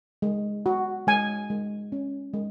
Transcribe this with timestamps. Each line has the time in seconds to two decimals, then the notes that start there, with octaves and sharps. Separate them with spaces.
0.22 G#3
0.66 F#4
1.07 G#3 G#5
1.50 G#3
1.92 C#4
2.34 G#3